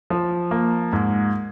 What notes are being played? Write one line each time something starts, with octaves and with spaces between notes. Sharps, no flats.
F3
A#3
G#2